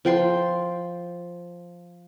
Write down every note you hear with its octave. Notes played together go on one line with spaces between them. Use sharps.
F3 G5 C6